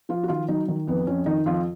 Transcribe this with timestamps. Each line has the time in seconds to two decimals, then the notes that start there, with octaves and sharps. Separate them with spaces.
0.09 F3 F4
0.23 F#4
0.28 D#3 F4
0.48 F#3 D#4
0.68 D#3
0.87 F2 B3
1.07 F2 C#4
1.26 D#3 D#4
1.46 F2 F4